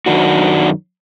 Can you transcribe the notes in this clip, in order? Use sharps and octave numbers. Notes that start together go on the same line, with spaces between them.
F#2 D#3 D4 F#4